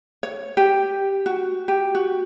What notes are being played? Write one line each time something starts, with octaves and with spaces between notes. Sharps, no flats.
C#5
G4
F#4
G4
F#4